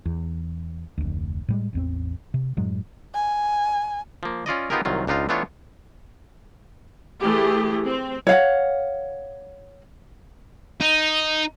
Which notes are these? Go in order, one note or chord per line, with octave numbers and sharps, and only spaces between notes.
E2
F1 D2
A2 G3 G#3
A1 E2 C4
C3
F#2 A2 F#3 G#3
G#5
F3 A#3
C#4 F4 D5 D#5
B3 D#4 F4 G4 G#4 A#4
C2 D#3 F#3 F4
C#2 D4 D#4 F4 F5
E3 A3 B3 D4 F4 C#5
E3 A3 G4 G#4
C4
C#5 F5 F#5
D#4